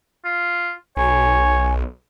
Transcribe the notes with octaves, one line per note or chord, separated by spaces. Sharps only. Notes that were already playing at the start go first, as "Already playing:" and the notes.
F4
B1 C#5 G#5